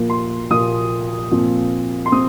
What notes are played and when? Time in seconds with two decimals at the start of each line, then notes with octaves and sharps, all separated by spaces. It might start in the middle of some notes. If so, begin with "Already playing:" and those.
Already playing: A#2 F3 A#3
0.10 C6
0.50 A#2 F3 A#3 D#6
1.31 A#2 F3 C4
2.06 C6
2.12 C4 D#6